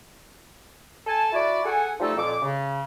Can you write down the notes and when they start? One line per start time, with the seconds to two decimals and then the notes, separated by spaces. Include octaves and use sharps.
1.06 A4 G#5 A5
1.33 E4 F#4 D5
1.64 G#4 A4 F#5 G#5
2.00 F3 G3 A3 D#4 F4 A4
2.17 F2 A#2 D6
2.42 C#3